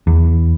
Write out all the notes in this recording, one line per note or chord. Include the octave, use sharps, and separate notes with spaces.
E2